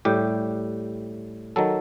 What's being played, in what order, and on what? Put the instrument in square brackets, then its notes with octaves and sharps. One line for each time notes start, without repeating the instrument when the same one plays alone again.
[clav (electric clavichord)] A2 G3 G4
D#3 F#3 A4